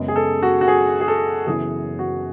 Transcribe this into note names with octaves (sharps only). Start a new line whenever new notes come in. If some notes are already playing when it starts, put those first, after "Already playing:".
Already playing: F#2 C#3 G#3 B3
G#4
A4
F#4
F#4
G#4
G#4
A4
F#1 F#2 E3 B3 E4 G#4
F#4